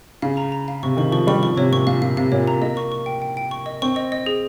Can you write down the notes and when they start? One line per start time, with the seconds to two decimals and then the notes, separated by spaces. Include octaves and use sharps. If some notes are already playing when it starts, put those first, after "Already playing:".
0.22 C#3 F5
0.37 A#5
0.52 A#5
0.68 F5
0.83 C3 C#6
0.97 D#3 C#6
1.12 F3 C#6
1.27 G3 C#6
1.43 F3 C#6
1.57 C3 C#5
1.72 A#2 C#6
1.87 A#2 F5
2.02 A#2 F5
2.17 C3 F5
2.32 A#2 C#5
2.47 A#5
2.62 A#3 D#5
2.77 C#6
2.92 C#6
3.06 G5
3.22 G5
3.37 G5
3.51 C#6
3.66 D#5
3.82 C4 C#6
3.96 D#5
4.12 D#5
4.26 G#4